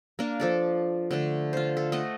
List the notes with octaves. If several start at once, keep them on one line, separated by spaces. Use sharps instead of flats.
A#3 D4
F3 A4 D5
D3 A3 D4
F4 C5
A4
A3 A4 D#5 F#5